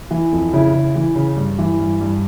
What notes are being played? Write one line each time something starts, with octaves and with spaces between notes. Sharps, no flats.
E3
F2
C#3 E4
C#3
E3
C#3
G2
E3
G2
G2